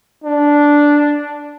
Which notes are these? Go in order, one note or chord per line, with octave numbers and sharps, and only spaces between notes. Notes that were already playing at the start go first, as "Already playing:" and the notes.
D4